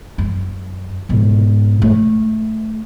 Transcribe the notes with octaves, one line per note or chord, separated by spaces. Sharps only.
F#2
G#2 B2
A3